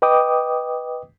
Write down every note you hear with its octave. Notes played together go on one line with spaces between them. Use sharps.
B4 D#5 G5 D6 D#6